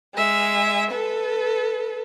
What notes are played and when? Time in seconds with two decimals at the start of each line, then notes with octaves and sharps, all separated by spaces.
0.14 G#3 E5
0.90 A4 B4